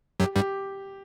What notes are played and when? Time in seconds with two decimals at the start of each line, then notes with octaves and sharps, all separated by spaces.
0.20 F#2 F#3 G4
0.36 G2 G3 G4